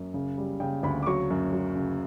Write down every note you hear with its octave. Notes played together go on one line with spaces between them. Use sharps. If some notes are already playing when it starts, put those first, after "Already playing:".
Already playing: F#2
C#3
G3
C#3 G5
D2 B5
D6
F#3 C#6
F#2
F#3
C#3